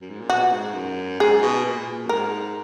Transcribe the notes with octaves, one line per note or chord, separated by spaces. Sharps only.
F#2
G#2
A#2
B2 F#4
G#2
F#2
G#2 G#4
B2
A#2
F#2
G#2 A#4